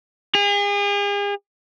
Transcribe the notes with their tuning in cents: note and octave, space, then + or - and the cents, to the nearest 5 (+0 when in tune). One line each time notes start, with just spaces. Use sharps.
G#4 -40